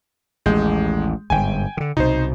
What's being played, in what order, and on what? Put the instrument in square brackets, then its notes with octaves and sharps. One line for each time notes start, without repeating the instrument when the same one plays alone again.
[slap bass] A1 D#2 [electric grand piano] G#3 G6
[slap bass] G1 G#2 [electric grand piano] G5 G#5
[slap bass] D3 D#3
[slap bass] C2 B2 [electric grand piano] D#4 C5